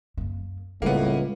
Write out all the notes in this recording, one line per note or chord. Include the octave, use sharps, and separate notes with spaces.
F#2 A#3
C#2 A2 G3 A#3 B3